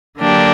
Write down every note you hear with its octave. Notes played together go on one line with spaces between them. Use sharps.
D3 F#3 A#3 D4 G4